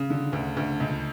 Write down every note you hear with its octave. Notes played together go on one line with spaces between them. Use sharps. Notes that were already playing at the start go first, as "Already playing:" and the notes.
Already playing: C#3
D3
D2
D2
C#2